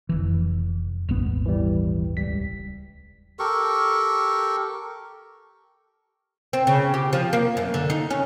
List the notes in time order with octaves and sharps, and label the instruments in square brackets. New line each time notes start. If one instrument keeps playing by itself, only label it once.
[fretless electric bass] F1 E3
D#1 G#1 B3
[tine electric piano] E3 G3
C#2 G3 B6
[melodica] G4 A4 A#4 C#6
[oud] C4
C#3
G4
F3
A#3
F#2
D3
D#4
C#4